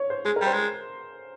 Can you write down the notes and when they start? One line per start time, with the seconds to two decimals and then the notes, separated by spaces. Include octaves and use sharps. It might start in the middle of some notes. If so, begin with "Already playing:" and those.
Already playing: C#5
0.10 C5
0.25 G#3 G#4
0.36 A#4
0.41 G3
0.47 C5
0.54 G#3